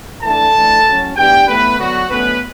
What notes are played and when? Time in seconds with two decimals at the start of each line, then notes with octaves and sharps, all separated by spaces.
0.22 E3 A3 D4 A4 A5
0.54 E3 A3 D4
0.85 A2 F#3 C#4
1.16 A2 E3 B3 D4 G4 G5
1.47 A2 E3 A3 B3 B4
1.78 D3 F#3 B3 F#4
2.09 D3 F#3 A3 B3 C#4 B4